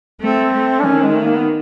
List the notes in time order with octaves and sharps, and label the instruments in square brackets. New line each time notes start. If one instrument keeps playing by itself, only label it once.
[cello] A3 [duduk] C4
[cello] A3
[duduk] D4
[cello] D#3 [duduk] C#4
[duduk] G#3
A3
A#3
B3